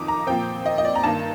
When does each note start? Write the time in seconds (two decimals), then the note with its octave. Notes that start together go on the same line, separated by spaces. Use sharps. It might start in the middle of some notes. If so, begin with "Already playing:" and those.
Already playing: F2 D#3 D#4 D6 D#6
0.08 A#5
0.27 A#2 F3 C4 G5
0.66 D#5
0.78 D#5
0.85 D5
0.95 A#5
1.04 G2 D#3 A#3 A5